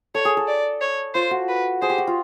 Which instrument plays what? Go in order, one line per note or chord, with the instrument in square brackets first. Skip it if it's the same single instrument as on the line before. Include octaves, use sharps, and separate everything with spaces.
[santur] A4 [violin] C#5
[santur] G#4
A4
[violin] D5
C#5
[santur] F4 [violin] C5
[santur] F#4
[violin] B4
[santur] G#4 [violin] C5
[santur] G4
F#4
F4